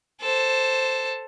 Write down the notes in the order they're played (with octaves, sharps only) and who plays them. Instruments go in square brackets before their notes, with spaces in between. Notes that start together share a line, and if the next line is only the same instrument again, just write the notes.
[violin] A4 C5